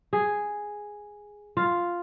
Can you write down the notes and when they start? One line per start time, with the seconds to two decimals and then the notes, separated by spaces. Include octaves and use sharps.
0.13 G#4
1.57 F4